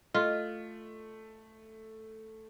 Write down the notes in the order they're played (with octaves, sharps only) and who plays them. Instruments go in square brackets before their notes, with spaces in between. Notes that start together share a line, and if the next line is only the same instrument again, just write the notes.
[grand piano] A3 [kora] F4 [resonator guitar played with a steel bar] D#5